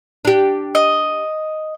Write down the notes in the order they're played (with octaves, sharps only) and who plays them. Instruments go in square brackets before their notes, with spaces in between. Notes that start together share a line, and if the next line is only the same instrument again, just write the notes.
[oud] D4 G4
[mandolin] D#5